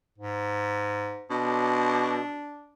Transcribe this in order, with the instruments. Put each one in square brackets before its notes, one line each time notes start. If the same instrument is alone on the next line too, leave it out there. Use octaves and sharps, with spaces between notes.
[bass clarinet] G#2
[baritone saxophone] B2 [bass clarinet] D4